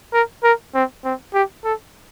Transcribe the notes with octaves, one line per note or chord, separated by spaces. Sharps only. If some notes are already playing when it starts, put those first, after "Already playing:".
A#4
A#4
C4
C4
G4
A4